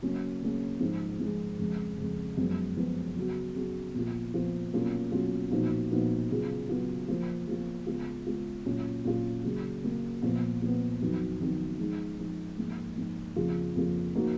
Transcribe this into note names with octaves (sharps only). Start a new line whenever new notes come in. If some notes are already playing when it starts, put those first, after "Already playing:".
C#3 F#3 A#3 C#4
C#3 F#3 A#3 C#4
G#2 F3 G#3
G#2 F3 G#3
F2 C#3 G#3
F2 C#3 G#3
F#2 F3 G#3 B3
F#2 F3 G#3 B3
C#3 F#3 B3 F#4
C#3 F#3 B3 F#4
A#2 F3 B3 F4
A#2 F3 B3 F4
B2 F#3 A#3 C#4 F4
B2 F#3 A#3 C#4 F4
A#2 F3 B3 D#4 F#4
A#2 F3 B3 D#4 F#4
C#3 F#3 B3 F4
C#3 F#3 B3 F4
F3 A#3 F4
F3 A#3 F4
C#3 G#3 B3 F4
C#3 G#3 B3 F4
A#2 F#3 C#4 F4
A#2 F#3 C#4 F4
C#3 F#3 A#3
C#3 F#3 A#3
A#2 F3 B3
A#2 F3 B3
F2 D#3 F#3 B3
F2 D#3 F#3 B3
F3 G#3 D#4
F3 G#3 D#4
G#2 F3 A#3
G#2 F3 A#3
F2 C#3 F3 A#3 F4
F2 C#3 F3 A#3 F4
F3 A#3 D#4 F#4